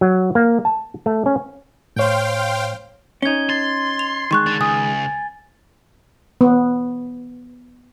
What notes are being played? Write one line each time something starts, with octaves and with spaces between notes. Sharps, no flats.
F#3
A#3
A5
A3
C#4
A2 C5 C#5 F5 G5
C#4 D#4 G#6 G7
C6 A6
F7
D#3 G#3 C6 C#6 F#6
D3 A6
C#2 G#5 D#6
B3